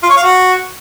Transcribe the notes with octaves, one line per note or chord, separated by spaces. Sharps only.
F4
C#5
F5
F#4